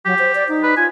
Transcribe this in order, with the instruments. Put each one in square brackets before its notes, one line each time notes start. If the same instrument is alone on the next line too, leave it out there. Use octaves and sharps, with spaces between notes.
[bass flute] F#3 [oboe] G4
[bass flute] C5
D5
D#4
[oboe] B4
[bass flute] F4 [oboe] G#5